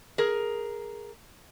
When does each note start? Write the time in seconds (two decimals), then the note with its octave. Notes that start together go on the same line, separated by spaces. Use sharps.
0.18 G#4 A#4